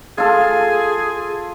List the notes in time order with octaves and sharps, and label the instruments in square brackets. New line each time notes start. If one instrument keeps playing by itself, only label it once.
[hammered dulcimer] F4 A4 [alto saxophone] G#4